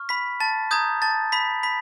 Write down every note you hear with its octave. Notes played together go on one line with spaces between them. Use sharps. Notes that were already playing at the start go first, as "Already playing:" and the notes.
Already playing: C#6 F6
B5 B6
A5 A6
A#5 D#6 G6 G#6
A5 A6
B5 B6
B5 B6